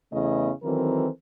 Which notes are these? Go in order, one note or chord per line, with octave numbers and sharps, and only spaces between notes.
E2 C#3 A3 B3 E4 D#5
D#3 E3 F#3 C4 A4 A#4